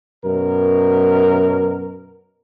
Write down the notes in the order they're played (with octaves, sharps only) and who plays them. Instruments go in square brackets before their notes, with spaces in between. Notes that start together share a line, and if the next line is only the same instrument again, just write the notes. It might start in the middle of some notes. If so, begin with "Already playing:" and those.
[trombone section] F#2 B2 A#4